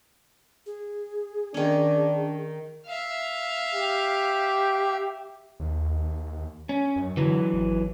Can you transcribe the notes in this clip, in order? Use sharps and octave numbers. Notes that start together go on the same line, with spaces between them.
G#4
D#3 C#4 D4
E5 F5
G4
D#2
C#4
F#2
D3 E3 F#3
G#1